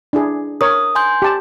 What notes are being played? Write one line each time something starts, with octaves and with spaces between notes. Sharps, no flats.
D4 E4 G#4
A#4 C#5 D#6
G#5 C6 G6
G4 A5